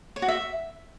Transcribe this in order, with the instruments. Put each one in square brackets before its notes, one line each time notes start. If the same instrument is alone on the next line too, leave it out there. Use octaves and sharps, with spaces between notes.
[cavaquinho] C#5
F#4
E5